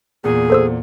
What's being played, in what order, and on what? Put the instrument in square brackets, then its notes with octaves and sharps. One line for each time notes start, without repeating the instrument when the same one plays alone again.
[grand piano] E2 A#2 [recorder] G#4
[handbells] A4 C5 E6